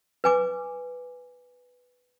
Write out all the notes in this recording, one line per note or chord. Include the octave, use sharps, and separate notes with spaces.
B4 G#5 D6